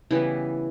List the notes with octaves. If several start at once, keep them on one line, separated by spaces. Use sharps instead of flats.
C#3 E3 G3 B3 E4